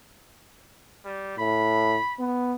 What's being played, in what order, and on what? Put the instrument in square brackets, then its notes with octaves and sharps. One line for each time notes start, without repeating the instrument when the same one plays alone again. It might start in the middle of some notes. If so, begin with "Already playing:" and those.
[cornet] G3
[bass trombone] A2 [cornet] B5
[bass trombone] B3